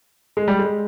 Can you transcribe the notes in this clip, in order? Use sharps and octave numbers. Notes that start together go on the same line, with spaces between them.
G#3
G3
G#3